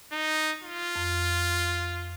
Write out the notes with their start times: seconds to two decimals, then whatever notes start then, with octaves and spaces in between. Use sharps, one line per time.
0.12 D#4
0.63 F4
0.96 F2